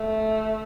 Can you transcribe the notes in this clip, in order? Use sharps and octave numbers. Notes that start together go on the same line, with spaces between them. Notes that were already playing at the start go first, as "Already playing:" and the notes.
Already playing: A3